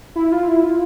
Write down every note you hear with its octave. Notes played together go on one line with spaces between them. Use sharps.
E4
F4
E4
F4